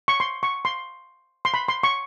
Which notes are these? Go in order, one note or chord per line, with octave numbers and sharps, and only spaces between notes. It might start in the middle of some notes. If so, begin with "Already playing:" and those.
C#6
C6
C#6
C6
C6
B5
C6
C#6